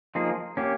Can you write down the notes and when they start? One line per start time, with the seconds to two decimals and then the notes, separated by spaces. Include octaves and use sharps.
0.15 F3 A#3 D#4 G#4
0.57 A#3 C#4 G4